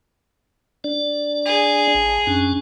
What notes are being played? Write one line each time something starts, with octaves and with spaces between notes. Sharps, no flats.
D4 D5
G#4
A1
F#2 C#4 D4